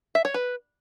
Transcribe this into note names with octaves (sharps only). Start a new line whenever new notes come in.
E5
C#5
B4